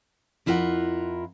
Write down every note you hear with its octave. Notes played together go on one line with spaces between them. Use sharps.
F2 E4 F4 A#4 F#5